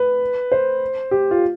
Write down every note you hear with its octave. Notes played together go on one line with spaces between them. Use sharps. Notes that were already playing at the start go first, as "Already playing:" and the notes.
Already playing: B4
C5
G4
F4